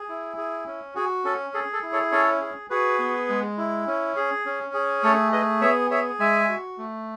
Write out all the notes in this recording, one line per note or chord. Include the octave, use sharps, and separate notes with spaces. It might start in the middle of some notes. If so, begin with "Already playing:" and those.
Already playing: G#4
E4
G#4
C#4
F#4 G#4
C#4 A4
G#4 A4
A4
E4
A4 C#5
C#4 A4 C#5
G#4
F#4 G#4 B4
B3
G#3
E4
C#4
G#4
C#4
G#4
A3 A4 C#5
G#4 B4 D#5
B3 C#5 E5
G#4 C#5 E5
G#3 E5 G#5
F#4
A3